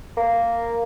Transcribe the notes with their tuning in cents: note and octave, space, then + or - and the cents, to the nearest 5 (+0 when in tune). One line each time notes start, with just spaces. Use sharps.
A#3 -5